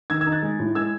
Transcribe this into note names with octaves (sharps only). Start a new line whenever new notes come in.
D#3 E6 G#6
E6 G#6
D#4
F#6 A6
G#3
A2
G#3 E6 G#6